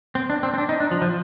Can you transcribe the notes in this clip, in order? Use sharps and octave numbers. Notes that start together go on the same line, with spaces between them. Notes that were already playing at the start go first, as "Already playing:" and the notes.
C4
D4
C4
C4
D4
D#4
D4
F3
F3